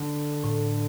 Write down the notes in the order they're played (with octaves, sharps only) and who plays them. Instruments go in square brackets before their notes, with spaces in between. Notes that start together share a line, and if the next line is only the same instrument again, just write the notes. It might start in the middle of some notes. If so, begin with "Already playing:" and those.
Already playing: [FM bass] D3
[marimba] A2